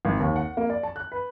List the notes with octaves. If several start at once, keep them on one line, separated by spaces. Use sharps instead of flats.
G#1
D#2
F#5
A#3
D5
A5
F#6
B4